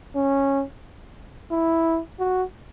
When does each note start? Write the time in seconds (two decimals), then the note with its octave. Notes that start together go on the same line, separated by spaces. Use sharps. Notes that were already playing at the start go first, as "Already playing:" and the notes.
0.16 C#4
1.52 E4
2.20 F#4